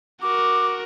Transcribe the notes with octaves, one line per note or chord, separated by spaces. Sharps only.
F#4 A#4 D6